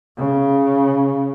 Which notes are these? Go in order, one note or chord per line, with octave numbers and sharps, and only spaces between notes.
C#3